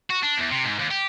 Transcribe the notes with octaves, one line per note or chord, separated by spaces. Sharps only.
F#4
D4
E2
C3
G#2
D#2
G4